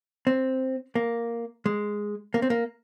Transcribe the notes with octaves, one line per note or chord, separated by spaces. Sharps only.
C4
A#3
G#3
A#3
C4
A#3